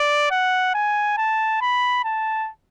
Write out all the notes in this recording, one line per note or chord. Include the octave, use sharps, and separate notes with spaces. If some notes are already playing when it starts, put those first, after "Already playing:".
Already playing: D5
F#5
G#5
A5
B5
A5